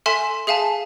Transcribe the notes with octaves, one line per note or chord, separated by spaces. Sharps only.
A4 E5 G#5 C6 B6 E7
G#4 E5 F5 G#5 A5